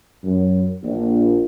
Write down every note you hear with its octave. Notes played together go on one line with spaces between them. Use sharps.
F#2
A#1